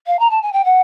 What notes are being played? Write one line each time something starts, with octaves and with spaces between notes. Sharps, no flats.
F5
A#5
A5
G#5
G5
F#5